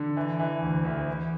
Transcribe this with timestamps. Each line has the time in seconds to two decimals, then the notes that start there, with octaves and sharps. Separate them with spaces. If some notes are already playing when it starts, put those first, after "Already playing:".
Already playing: D3
0.17 E3
0.40 E3
0.62 D2
0.85 D2
1.08 E3